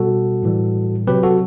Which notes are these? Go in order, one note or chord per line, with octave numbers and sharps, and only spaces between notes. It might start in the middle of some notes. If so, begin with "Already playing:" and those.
Already playing: B2 G3 F#4 A4
A2 E3 G3
C3 F#3 G4 B4
F#4 A4